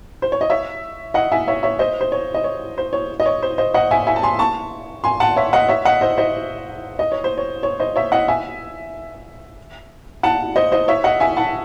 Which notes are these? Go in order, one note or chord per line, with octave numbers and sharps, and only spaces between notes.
C5
C#5
D#5
C#5 E5
D#5 F#5
E5 G#5
C#5 E5
C#5 E5
C5 D#5
C5
C#5
D#5
C#5
C5
C#5
D#5
C#5
C5
C5 D#5
D#5 F#5
E5 G#5
E5 G#5
A5
G#5 C6
A5 C#6
G#5 C6
F#5 A5
C#5 E5
D#5 F#5
C#5 E5
D#5 F#5
C5 D#5
C5 D#5
D#5
C#5
C5
C#5
C#5
C5 D#5
C#5 E5
D#5 F#5
E5 G#5
F#5 A5
C5 D#5
C5 D#5
C#5 E5
D#5 F#5
E5 G#5
F#5 A5